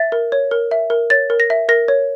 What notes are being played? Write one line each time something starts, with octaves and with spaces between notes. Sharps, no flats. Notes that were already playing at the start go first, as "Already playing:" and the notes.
Already playing: E5 A6
A#4
C#5
A#4
E5
A#4
C#5 A6
A#4
A#6
E5
A#4 A#6
C#5